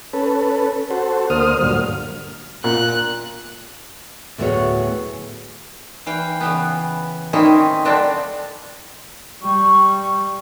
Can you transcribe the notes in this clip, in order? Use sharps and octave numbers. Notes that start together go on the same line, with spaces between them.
C#4 A4 B4
F#4 A4 C5
D2 A#3 C5 D#6 F6
D2 G2 A#2 F#3 F6
A#2 F#6
D2 A2 F#3 B3 G#4 C#5
E3 F5 G5
C#3 E3 B3
D#3 C4 C#4 D#4 E4
D3 F#3 A3 C4 D4 A4
G3 C#6